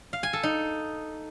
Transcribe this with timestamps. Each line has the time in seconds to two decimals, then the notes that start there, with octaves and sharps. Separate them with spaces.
0.13 F5
0.23 G#5
0.33 A4
0.43 D#4